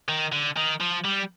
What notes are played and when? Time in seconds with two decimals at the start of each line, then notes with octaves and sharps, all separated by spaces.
0.08 D#3
0.32 D3
0.57 D#3
0.81 F3
1.05 G3